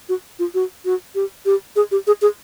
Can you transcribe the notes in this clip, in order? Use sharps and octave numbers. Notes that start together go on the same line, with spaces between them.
F#4
F4
F#4
F#4
G4
G4
G#4
G4
G#4
G#4